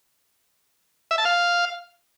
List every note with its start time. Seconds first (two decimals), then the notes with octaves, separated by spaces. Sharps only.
1.11 E5
1.18 A5
1.25 F5